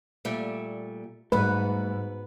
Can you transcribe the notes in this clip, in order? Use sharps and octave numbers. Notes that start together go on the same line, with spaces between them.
A#2 G3 A3
G#2 G3 A3 B3 F#4 B4